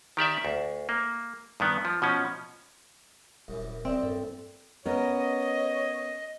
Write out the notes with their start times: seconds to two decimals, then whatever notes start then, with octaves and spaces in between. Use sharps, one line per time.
0.17 D#3 G4 D5 E5
0.45 D2
0.89 A#3
1.60 G2 D#3 B3
1.85 F3
2.02 B2 F3 C#4
3.48 D#1 C2 F#2 E3
3.85 C2 F#2 C4 D5 E5 G5
4.03 G2 A4
4.86 B3 C#4 A#4 C#5 D#5